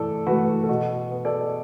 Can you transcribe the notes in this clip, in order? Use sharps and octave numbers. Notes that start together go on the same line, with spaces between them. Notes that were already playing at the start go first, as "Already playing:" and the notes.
Already playing: A2 E3 A3 A4 D5
E3 A3 F#4 B4
A4
B2 F#4
B3
A4 D5